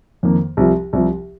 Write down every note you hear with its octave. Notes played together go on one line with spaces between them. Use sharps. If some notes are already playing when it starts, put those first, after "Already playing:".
F2 D#3 A#3
C2 C3 F3
C2 C3 F3